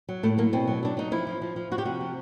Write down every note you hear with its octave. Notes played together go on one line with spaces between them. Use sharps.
F#3
A2 A3
F#3 A#3
B2 C4
F#3
F#3 D4
F#3 D#4
F3 E4
F3
F3
F3
F3 F#4
G4
C3 F#4
F3